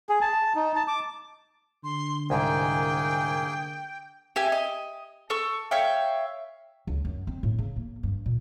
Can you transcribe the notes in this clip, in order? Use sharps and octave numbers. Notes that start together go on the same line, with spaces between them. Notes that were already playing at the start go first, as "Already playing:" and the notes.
G#4
A5
D#4
A5
D6
D3 C6
C2 G#2 A#3 G#4 G5 G#5
G4 E5 G#5
D#5
A4 C#6 E6
C#5 E5 F5 G5
C#2
F#2
C4
A2
C#3
A#3
G2
A#2